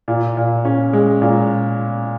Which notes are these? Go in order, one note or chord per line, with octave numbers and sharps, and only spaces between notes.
A#2
A#2
C#4
G#3
A#2